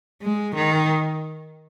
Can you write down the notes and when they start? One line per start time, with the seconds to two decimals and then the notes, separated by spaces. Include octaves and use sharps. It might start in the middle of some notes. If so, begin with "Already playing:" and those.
0.22 G#3
0.55 D#3